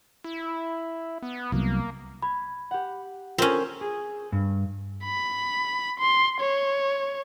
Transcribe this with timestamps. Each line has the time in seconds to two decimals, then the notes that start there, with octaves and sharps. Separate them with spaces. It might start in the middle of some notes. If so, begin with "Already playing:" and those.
0.24 E4
1.22 B3
1.52 C2 F#3 A#3 B3
2.22 B5 G#6
2.71 G4 F#5
3.38 C4 C#4 F4 A#4
3.81 G#4
4.32 G2
5.04 B5
6.00 C6
6.41 C#5